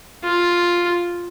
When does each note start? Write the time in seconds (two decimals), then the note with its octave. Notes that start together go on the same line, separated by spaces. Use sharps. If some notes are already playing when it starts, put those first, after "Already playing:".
0.24 F4